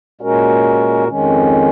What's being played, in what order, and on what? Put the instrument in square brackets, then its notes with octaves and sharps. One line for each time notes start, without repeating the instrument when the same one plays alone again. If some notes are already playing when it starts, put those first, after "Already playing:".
[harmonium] A#2 G#3 C#4 F#4 A#4
F2 D#3 G#3 C#4